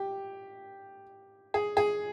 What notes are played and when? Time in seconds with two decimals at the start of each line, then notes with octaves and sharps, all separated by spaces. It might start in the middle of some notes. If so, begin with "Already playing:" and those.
Already playing: G4
1.54 G#4
1.77 G#4